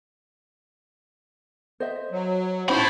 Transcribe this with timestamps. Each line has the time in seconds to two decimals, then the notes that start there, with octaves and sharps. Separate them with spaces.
1.80 C5 D#5 E5
2.11 F#3
2.69 A2 C#4 D#4 E4 C5 B5